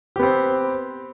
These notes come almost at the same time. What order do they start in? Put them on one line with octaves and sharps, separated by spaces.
G4 B3 C4